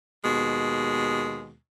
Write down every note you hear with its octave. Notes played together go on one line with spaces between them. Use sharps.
D#2 B2 G#3